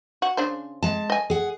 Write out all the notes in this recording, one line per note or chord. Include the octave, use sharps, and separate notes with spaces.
F#4
C#3 D4 C5
G#3 A5
D#5 G#5
G#4 F#5